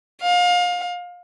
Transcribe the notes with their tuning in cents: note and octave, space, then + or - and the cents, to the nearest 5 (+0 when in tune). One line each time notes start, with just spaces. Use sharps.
F5 +30